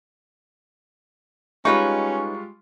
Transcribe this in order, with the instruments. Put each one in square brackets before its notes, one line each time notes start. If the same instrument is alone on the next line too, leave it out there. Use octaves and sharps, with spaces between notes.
[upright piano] G3 G#3 F4 [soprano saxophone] C#4 [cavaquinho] D#4 B4 C#5 [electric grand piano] C#6